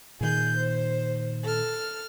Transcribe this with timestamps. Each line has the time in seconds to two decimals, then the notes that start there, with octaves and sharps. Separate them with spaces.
0.21 A#2 D#3 G#4 G6
0.57 C5
1.45 A4 F6